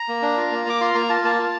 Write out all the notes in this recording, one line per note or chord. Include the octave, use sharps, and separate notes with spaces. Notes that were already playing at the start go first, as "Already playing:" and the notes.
Already playing: A#5
A#3
D4
F4
A#3
A#3 D6
F4 C6
A#3 A#5
F4 A5
A#3 A5
F4